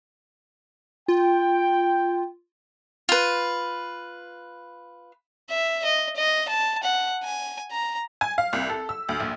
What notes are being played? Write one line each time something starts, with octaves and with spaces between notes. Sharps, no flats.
F4 G5
F4 B4
E5
D#5
D#5
A5
F#5
G#5
A#5
G#5
F5
C2
A4
E6
D2
A#1